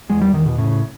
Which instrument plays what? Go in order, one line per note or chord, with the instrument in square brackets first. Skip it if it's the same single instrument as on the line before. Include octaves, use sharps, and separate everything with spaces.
[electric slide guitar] E2 [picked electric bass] G#3
[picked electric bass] G3
[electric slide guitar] E2 [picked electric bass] D#3
[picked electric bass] B2
[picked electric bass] A2 [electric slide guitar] C#3